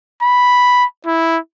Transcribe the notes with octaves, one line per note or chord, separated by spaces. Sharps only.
B5
E4